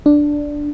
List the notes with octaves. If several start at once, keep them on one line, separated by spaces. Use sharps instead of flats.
D4